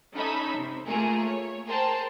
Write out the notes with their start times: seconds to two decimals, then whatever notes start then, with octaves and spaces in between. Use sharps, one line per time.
0.16 C#4 D#4 A4 E5 B5
0.57 C3
0.88 A3 A#3 F4 G#4 A#4
1.25 C#5
1.66 G#4 A#4 C5 G5 A5 C6